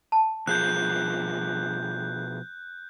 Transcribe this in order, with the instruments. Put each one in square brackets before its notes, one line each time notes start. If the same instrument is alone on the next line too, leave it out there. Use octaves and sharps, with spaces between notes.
[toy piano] A5
[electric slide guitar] B2 F3 G#4 [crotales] F#6 G6